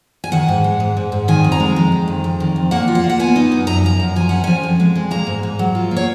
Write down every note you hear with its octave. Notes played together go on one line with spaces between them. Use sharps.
G#5
D#3 F#5
G#2
G#3
G#2
G#2
G#2
D#3 G#5
F2
A#5
G#3
G#3
D#3
F2
F2
D#3
F2
A#3 F#5
F4
F#5
A#3
F#5
B3 G#5
D#4
F#2
F#2 A#5
F3 A#5
F#2
F3 G#5
C#4 F#5
F3 G#5
F2
G#3
G#3
A#3 A#5
G#2
G#2
F#3
F4
A#3
C#5